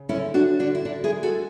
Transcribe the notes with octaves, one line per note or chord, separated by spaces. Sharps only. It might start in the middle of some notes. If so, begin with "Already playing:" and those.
Already playing: C#3
D3 C#4 E4
D3 D4 F#4
D3 D4 F#4
E4
D3 D4
E4 G#4
G#3
F#4 A4